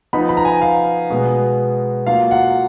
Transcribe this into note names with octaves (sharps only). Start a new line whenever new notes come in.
F3 B3 D#4 B5
B5
A#5
G#5
F5
B2 G#3 B3
F#3 A#3 F4 F5
F#5